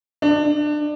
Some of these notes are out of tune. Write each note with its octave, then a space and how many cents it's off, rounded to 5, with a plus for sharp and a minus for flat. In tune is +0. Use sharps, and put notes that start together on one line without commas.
D4 +25